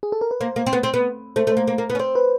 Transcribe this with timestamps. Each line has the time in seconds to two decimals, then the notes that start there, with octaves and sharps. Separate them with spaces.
0.03 G#4
0.12 A4
0.21 A#4
0.31 B4
0.41 A#3 C5
0.56 A#3
0.66 C4
0.73 B3
0.83 C4
0.94 B3
1.36 A3 C5
1.47 A3
1.52 A#3 C5
1.67 A#3
1.78 A#3
1.90 B3
1.95 C#4
1.99 C4 C5
2.15 B4